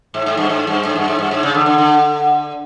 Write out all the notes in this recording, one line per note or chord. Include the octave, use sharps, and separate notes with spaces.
G#2
G#2
G2
G#2
G2
G#2
G2
G#2
G2
G#2
C#3
D3
D3
D3